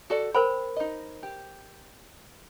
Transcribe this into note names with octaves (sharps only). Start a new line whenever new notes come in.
F#4 A4 D5
A#4 C5 G5 B5
D#4 D#5
G4